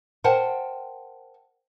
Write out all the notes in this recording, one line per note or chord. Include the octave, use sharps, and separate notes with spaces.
A#4 C5 F#5 G5 A5